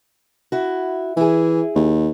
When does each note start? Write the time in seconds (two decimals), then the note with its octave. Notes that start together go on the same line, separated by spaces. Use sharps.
0.52 E4 F#4
1.17 E3 E4 G#4
1.75 D#2